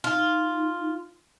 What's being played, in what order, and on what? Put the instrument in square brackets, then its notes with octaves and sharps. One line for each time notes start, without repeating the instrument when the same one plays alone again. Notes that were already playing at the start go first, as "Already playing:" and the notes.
[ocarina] D#4 [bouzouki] F4